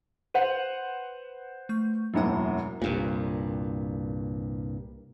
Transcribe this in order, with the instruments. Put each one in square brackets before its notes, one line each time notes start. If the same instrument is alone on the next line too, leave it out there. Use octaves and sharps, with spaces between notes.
[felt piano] B4 C5 F#5 [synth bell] D#7 F7 F#7
[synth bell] A3 C#6 G6
[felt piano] E1 F#2 A2 [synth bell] F#3 A#3 F#5
[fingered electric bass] C2 G2 A#2